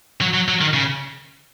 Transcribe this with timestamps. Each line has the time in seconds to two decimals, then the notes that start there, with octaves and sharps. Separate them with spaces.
0.21 F#3
0.34 F#3
0.48 F#3
0.61 D#3
0.74 C#3